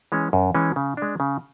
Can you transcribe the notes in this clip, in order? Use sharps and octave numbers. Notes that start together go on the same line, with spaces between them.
E3 G#3 C#4
F#2
E3 G#3 C#4
C#3
G#3 D4
C#3